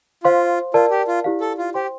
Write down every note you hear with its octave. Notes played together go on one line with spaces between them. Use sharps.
F4 C5 F5 C6
F4 A#4 D5 A5
G4
F4
E4 G4 D5 F5
A4
F4
G4 C5 G5 C6